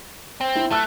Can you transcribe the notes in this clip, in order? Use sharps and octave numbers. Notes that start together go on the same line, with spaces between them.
C4
E4
A3 A5 E6 F#6